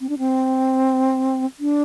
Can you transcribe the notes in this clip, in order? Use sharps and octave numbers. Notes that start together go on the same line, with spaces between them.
C4
D4
C4
D4